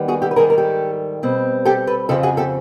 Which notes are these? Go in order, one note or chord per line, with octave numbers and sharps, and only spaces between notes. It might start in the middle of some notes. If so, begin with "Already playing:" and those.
Already playing: D#2 D#3 G3 B3
F#4 G#4
G4 A4
B4
G#2 D#3 G3 G#4 A#4
A#4
G4 A4
B2 G3 C4
G4 A4
A4 B4
F2 C#3 F3 G4 A4
F#4 G#4
G4 A4